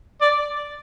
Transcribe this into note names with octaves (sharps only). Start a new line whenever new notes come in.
D5